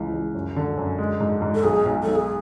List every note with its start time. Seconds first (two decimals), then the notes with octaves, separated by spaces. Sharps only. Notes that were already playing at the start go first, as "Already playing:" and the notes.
Already playing: C#2 E3
0.13 C#2
0.34 F#2
0.56 D3
0.77 F#2
0.98 G#3
1.20 G#2
1.42 G#2
1.55 A4
1.64 B1 G#4
1.86 B1
2.03 B1 A4
2.16 G#4